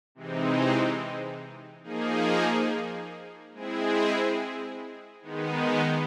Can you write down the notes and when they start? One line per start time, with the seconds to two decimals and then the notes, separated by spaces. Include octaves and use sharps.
0.15 C3 E3 G#3 C4 D#4
1.83 F3 A#3 D#4 G#4
3.53 G#3 C4 E4 G#4
5.22 D#3 G#3 B3 D#4